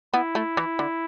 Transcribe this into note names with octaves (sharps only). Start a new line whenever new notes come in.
B3 E4
A3
E3
D3